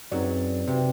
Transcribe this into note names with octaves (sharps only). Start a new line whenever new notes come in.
F#2 F#3 C4 D#4 G#4 B4 D5
C3 F#4 B4 E5 G5